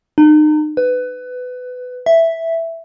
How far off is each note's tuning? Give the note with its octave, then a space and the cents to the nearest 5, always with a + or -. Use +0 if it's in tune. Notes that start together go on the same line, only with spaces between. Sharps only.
D#4 -35
B4 +20
E5 +0